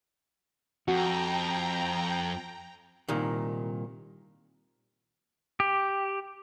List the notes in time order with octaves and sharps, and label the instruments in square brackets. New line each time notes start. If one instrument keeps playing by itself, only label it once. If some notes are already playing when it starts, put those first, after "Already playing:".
[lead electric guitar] F2 [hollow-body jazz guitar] F#4 [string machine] G5 A#5
[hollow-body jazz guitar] C2 A#2 D#3
[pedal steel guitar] G4